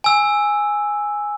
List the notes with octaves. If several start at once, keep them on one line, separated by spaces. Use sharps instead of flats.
G#5 E6